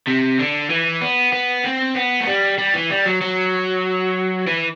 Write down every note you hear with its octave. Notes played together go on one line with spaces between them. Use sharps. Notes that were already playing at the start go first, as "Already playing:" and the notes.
C3
D3
E3
B3
B3
C4
B3
A3
G3
G3
E3
G3
F#3
F#3
E3